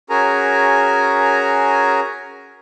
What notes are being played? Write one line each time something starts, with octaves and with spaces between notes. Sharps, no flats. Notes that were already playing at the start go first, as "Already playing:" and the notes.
C#4 F#4 G#4 A#4 G#5 A#5